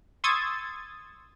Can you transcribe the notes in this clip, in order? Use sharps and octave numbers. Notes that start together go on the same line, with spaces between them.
C6 C#6 D#6 E6 G#6 A6